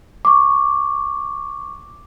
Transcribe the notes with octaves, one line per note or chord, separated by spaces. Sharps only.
C#6 D6